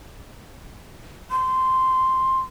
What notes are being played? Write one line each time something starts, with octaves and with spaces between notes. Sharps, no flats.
C6